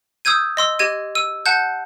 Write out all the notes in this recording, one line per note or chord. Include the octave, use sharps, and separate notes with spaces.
D#6 E6 G6 G#6 D#7
D#5 C6 E6
G4 D#5 G#6 D#7
E6 D#7
F#5 A5 F#6 G6